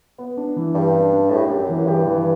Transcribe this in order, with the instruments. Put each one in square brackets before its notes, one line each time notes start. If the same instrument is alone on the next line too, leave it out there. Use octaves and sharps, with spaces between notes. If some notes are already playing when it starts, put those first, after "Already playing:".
[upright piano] B3
D4
E3
[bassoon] G2 [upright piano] G4
[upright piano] D4
D4
[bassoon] A2 [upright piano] G4
[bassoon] F#2
[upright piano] G4
[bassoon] F#2
[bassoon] F#2 [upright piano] E3
[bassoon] G2 [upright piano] G4
[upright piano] E3